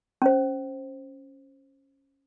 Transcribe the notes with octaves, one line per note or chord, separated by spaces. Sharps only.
C#4 C5